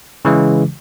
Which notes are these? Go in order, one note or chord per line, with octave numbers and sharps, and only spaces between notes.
C#3 E3 G#3